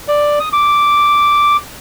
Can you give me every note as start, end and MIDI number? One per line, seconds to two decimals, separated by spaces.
0.08 0.39 74
0.40 0.49 87
0.53 1.57 86